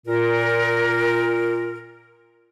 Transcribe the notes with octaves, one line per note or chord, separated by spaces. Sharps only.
A#2 A#4